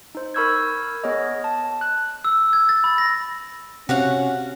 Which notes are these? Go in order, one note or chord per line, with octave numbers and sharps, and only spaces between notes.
D#4 C5
A#4 B5 C#6 E6 G6 G#6
B3 G#4 C#5 D#5
A5
F#6
E6
G#6
A6
B5
A#6
C3 C#4 F#4 F5 F#5